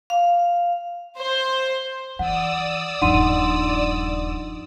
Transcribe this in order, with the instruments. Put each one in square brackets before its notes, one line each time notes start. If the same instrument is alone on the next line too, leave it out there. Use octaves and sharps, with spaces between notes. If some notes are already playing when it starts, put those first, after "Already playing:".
[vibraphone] F5
[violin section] C5
[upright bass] E3 [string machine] D5 D#6 E6 [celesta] F#5
[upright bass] D#1 G2 [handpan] F3 D4 D#4 [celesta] F#5 C6 D#7